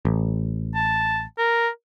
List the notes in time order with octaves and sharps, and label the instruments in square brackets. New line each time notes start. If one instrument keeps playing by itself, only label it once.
[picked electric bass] A1
[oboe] A5
A#4